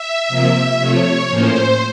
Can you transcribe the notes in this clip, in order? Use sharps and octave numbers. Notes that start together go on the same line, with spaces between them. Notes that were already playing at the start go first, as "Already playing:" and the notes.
Already playing: E5
C3 F3 A#3
C3 F3 A3 C#5
A2 F3 A#3 C#4 C5